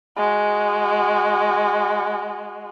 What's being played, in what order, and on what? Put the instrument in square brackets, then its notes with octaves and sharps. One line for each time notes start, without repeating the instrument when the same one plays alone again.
[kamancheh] G#3 F#4